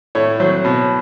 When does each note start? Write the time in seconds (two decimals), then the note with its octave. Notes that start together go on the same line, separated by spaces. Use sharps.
0.15 A2 C#5
0.40 F#3 C5
0.65 B2